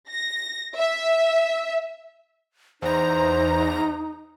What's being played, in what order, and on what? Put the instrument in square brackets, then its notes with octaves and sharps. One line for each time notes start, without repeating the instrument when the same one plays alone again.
[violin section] A#6
E5
[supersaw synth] E2 A#5 [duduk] D#4 [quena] C5